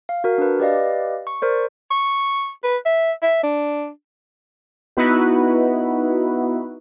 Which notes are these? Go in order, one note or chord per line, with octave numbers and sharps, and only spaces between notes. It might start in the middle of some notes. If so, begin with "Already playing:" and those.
F5
F#4 A#4
D4 B4
G4 B4 D5 D#5 F5
C#6
A#4 C5 D5
C#6
B4
E5
E5
D4
B3 D#4 E4 F#4 B4